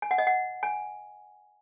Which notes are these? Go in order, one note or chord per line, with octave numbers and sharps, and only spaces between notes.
G#5
F#5
D#5
F#5
G#5